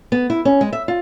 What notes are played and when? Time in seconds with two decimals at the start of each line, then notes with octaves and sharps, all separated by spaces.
0.12 B3
0.30 E4
0.45 C#4
0.61 G#3
0.73 E5
0.88 F4